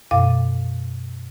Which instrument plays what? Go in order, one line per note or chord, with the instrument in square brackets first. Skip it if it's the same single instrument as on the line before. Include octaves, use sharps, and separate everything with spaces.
[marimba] F#2 B2 F5 D6